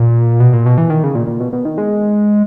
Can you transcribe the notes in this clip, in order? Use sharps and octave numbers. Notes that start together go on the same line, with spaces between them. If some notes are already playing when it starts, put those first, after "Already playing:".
Already playing: A#2
B2
A#2
B2
E3
D#3
C#3
A#2
A#2
B2
B2
D#3
G#3